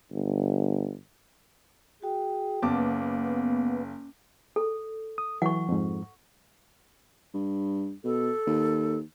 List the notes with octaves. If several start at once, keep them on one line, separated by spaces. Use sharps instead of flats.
G1
F#4 G#4 G5
F#1 A#3 B3 C#4 A5 D6
A4
D#6
E3 F#3 F#5 C#6
F2 G#2
G2
B2 A4
D#2